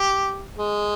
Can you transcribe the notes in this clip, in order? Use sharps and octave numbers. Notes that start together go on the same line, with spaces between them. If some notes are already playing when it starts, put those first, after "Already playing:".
Already playing: G4
G#3